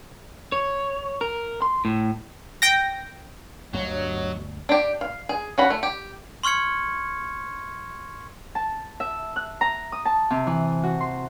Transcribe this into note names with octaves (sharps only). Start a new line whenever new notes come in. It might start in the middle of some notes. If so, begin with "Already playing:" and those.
C#5
A#4
C6
A2
G5 A#6
G1 D2 G2 F#3 C#5 D#5
D4 G4
F5
G#4
C#4 F#4 B5
A3
G4
C6 C#6 F6 G#6 C#7
A5
E5
F#6
A#5
D#6
A5
C3
E3
F#4
C6